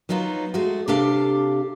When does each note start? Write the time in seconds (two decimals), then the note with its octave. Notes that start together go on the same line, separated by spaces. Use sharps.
0.09 F#3 B3 D#4 F4 F#4
0.54 G#3 A3 F#4
0.88 C3 D4 G4 A4 F5 G5